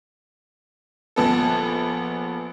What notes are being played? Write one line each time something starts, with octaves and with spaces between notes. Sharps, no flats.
A#1 B3 A4